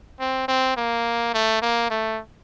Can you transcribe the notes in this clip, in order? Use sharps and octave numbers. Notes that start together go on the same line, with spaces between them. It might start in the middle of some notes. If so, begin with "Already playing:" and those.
C4
C4
A#3
A3
A#3
A3